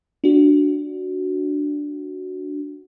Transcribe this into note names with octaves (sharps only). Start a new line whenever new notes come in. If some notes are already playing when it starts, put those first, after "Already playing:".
D4 F#4